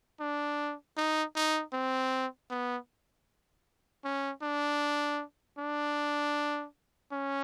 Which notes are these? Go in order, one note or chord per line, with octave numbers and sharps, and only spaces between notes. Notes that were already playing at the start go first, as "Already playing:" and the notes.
D4
D#4
D#4
C4
B3
C#4
D4
D4
C#4